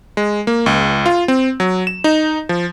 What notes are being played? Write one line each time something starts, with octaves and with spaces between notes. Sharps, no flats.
G#3
A#3
C#2
F4
C4
F#3
E7
D#4
F3